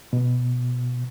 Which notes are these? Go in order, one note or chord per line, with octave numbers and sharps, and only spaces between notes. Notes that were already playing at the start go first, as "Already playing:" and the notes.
B2